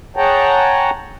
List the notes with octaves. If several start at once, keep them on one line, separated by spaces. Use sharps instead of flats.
G#4 C#5 F#5 G5 A5 A#5